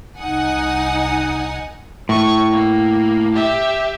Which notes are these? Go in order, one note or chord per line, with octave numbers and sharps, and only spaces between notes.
C2 D#4 F#5 G#5 D#6
A2 C#6
A#3
G4 E5